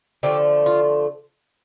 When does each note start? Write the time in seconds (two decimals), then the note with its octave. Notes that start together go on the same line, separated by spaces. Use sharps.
0.23 D3 F3 A3 G4
0.66 F4